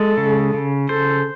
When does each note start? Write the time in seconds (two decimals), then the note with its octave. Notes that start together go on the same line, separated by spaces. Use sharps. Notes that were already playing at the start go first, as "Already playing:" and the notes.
Already playing: G#3 A4
0.17 C#3
0.54 C#3
0.89 A4 C5